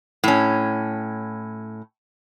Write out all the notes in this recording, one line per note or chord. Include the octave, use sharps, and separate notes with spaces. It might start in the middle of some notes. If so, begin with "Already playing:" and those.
A2 C#4